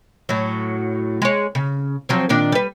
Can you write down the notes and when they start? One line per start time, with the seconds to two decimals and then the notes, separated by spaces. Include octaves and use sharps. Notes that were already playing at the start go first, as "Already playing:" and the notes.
0.29 A2 F#3
1.22 G#3 C#5
1.55 C#3
2.09 F3 F#3 C4
2.29 A#2 D#3 D4
2.52 G3 B4